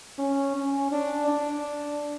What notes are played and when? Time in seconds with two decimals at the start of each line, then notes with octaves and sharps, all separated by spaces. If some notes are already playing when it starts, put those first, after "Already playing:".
0.19 C#4
0.56 C#4
0.92 D4
1.28 D4